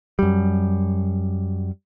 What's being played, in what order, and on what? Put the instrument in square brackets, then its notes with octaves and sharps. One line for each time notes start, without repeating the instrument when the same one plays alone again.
[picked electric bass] F#2 G3